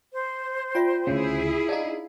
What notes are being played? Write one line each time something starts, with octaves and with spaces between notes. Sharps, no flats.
C5
F4 D5 E5 G5
D2 C#3 E4 G#4
D4 D#4 D#5 F5